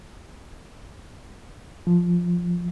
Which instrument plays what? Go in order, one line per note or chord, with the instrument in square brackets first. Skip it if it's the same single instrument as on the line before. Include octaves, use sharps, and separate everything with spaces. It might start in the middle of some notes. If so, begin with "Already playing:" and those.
[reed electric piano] F3